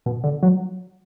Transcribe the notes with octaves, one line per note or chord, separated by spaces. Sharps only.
B2
D3
F#3